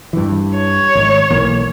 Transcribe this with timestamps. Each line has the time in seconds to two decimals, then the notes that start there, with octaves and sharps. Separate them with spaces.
0.13 G2 E3
0.58 C#5
0.95 G#1
1.30 B1 E3 A#3